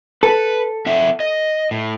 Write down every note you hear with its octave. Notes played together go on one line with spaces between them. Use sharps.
A4 B4
C4 E5 F#5
D#5
A2